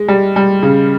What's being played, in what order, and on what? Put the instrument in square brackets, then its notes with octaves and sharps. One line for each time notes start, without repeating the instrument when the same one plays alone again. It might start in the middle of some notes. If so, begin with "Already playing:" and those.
Already playing: [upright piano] G#3
G3
G3
C#3